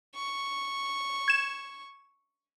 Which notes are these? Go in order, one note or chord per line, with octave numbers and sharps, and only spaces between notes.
C#6
G#6 E7